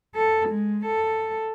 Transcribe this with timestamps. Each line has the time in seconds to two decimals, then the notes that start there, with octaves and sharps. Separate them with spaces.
0.15 A4
0.49 G#3
0.86 A4